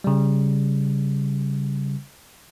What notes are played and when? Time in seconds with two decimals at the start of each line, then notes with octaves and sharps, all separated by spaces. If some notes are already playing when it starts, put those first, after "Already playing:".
0.04 C#3 G3